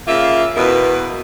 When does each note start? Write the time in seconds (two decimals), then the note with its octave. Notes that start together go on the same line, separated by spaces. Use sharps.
0.08 C#3 A#3 F4 E5
0.56 E2 B2 A#4 B4